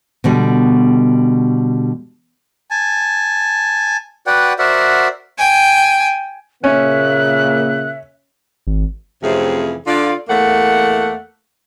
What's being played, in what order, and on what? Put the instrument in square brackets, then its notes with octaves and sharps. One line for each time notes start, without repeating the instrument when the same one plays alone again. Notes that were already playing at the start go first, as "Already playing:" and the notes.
[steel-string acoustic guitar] B2 D3 G3
[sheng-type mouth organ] G#5 A5
F#4 B4 D5 F#5 G5
F#4 A#4 C5 D5 E5 F#5
[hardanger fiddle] G5 G#5
[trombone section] A#2 C#3 A#3 [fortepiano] C#4 [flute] E5 [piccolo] F#6
[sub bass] G#1
[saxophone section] F2 C3 E3 A3 C#4 G#4
D3 F4 D5
E2 A3 A#3 F#5